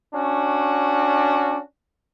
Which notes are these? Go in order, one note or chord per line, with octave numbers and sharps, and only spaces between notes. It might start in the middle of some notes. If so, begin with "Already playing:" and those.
C#4 D4 F#4